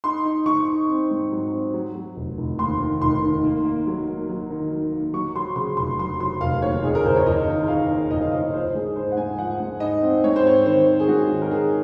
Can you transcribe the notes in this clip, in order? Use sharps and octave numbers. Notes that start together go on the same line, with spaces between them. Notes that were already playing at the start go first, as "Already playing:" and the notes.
D#4 C6
D#4
D#4 C#6
D#4
C4
G#2
F#3
C4
F#3
F#3
F1
F1
D#2 C6
D#3
F1 C6
D#3
A#3
A#3
F#3
A#3
F#3
D#3
F#3
A#3
F#3 C#6
F#3 C6
C#3 C6
F1 C6
F#3 C6
F#3 C6
F1 F5
D#2 C#5
F2 G#4
A#4
F#1 C5
C#5
F#1 D#5
D#3
F#1 F5
D#3
F#1 D#5
F5
F#1 D#5
F3 C5
G#2 G#4
D#4 C5
F#5
G#2 G#5
F3 F#5
G#2
D#4 D#5
C4
G#2 C#5
C5
C4 C#5
D#3 C5
D#3
G#4
G#2 F#4
D#3
A#4
D#3 G#4